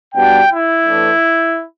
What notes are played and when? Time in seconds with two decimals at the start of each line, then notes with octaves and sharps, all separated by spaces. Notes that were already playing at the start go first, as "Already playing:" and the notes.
0.14 B2 G3 B3 D4 G5
0.49 E4
0.85 A2 E3 A3 D4